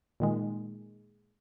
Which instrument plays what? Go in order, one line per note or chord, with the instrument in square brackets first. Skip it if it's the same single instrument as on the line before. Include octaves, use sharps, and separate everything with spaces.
[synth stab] A#2 D#3 G#3